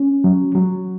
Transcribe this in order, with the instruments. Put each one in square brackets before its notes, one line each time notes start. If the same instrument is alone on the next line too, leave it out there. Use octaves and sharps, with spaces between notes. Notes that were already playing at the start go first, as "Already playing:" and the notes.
Already playing: [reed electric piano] C#4
F#3
F#3